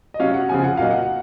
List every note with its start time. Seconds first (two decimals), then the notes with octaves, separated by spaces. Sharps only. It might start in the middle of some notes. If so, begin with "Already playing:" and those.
0.14 D#5
0.19 C3 F#3 C#4 F5
0.34 F#5
0.49 C#3 F3 C4 G#5
0.64 F#5
0.77 A#2 F#3 A#3 D#4 F5
0.91 F#5